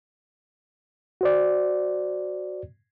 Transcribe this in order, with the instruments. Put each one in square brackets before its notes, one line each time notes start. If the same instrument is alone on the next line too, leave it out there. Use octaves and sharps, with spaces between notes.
[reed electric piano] F#4 C5 D5